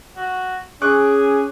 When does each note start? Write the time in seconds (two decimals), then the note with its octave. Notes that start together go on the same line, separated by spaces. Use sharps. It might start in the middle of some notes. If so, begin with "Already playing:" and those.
0.16 F#4
0.82 C#4 G#4 C#6 D6 F#6